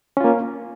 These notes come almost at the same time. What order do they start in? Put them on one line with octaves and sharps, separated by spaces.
C#4 F4 A#3